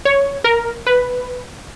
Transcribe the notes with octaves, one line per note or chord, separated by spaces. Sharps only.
C#5
A#4
B4